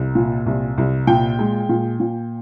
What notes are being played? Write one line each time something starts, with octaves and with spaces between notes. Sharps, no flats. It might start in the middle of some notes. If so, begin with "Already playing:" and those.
Already playing: C2
A#2
C2
C2
A#2 G5
G#3
A#2
A#2